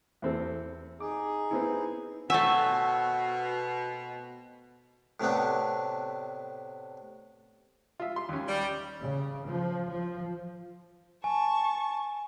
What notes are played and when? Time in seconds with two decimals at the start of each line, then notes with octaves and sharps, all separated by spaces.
0.22 E2 C4 A4
1.00 D#4 G#4 D6
1.51 B3 C4 E4
2.30 B2 A3 C4 C#5 E5 F#5 G#5
5.20 A2 C3 A3 B3 D4
8.00 F4 E5
8.16 C6
8.29 D#2 C#4
8.48 G3
9.02 C#3
9.46 F3
9.89 F3
11.24 G#5 A5 C#6